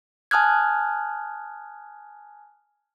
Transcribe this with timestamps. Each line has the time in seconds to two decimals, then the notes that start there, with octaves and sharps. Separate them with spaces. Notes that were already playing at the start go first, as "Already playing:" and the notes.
0.31 G#5 A5 D#6 F6 F#6 G#6